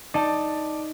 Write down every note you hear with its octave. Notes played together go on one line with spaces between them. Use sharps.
D#4 D5 A5